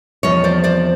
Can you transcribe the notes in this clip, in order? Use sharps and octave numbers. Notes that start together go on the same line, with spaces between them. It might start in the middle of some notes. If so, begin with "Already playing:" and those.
E2 C3 F3 C#5 D#5
C5 D5
C5 D5